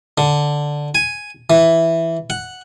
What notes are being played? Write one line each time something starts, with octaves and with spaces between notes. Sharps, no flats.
D3
G#5
E3
F#5